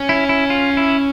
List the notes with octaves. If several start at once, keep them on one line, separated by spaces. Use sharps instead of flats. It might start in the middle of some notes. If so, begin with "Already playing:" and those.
Already playing: C#4
E4
E4
F4
E4